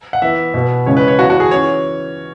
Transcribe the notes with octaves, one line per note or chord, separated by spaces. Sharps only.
F#5
E3 B3 E5
B2 B3
C#3 E3 G#3 C#4 C#5
B4
C#5
E3 B3 F#4
F#4
G#4
E3 C#4 C#5